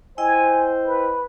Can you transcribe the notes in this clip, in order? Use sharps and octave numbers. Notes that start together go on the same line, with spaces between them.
E4 C5 D#5 G5 G#5
B4